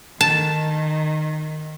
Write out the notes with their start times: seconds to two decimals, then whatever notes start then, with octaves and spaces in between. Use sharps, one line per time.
0.21 D#3 A5